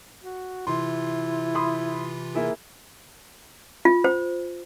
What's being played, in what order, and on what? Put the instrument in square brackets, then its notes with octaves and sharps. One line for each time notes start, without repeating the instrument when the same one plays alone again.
[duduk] F#4
[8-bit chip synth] C3 E3 F4 [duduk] E4 [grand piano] C6
[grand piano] B5 C6 D#6
A#3 E4 G#4
[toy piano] F4
C5